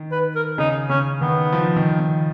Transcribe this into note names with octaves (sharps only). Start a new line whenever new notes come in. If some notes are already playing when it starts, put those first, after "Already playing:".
Already playing: D#3
B4
A#4
C#3 D#4
C#3 C#4
D#3 B3
F3
D#3
D#3